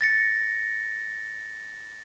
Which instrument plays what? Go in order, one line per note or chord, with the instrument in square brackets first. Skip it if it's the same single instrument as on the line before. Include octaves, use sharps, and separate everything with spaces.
[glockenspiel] A6 A#6 C#7